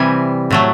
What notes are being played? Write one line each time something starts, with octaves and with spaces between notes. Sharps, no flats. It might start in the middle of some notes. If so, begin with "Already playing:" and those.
Already playing: C3 E3 G3 G#5
A2 F#3 A3